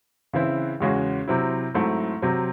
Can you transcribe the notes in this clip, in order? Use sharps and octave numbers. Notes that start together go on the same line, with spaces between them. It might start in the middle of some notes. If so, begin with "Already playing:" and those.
C#3 E3 C4 E4
E2 C#3 G#3 C#4 F#4
C3 F#3 C4 E4
G#2 F#3 A3 C4 E4
C3 F#3 C4